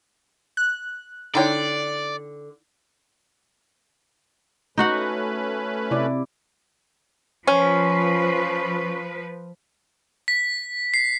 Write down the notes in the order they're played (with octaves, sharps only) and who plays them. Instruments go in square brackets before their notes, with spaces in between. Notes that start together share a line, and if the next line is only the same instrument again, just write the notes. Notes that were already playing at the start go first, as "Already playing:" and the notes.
[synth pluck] F#6
[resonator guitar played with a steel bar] D3 G5 [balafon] D#4 E4 C#5 [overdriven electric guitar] D5
[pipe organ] A3 C#4 B4 [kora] D#4 F#4 F#5
[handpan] C3 E4 D5
[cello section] F3 B4 [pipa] C#4
[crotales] B6
C7